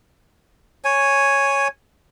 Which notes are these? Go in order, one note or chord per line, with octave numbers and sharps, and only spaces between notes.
C#5 G#5